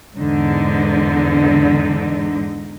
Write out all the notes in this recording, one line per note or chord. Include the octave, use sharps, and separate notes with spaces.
E2 G#2 D3 D#4